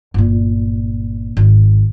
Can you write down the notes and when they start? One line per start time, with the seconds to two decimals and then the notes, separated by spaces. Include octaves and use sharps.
0.14 G1 A#2
1.37 G#1